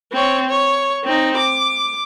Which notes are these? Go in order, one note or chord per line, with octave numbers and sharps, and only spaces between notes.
C4 C#5
C#5
C4 D#4
D6